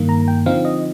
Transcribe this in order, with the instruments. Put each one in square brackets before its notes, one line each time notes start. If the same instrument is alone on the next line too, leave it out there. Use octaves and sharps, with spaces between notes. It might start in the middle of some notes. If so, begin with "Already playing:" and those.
Already playing: [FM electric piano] G2 D#3 A#3
A#5
G5
D3 F3 C4 D#4 F5
D#5